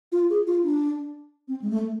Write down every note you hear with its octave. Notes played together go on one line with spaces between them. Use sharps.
F4
G#4
F4
D4
C4
G#3
A3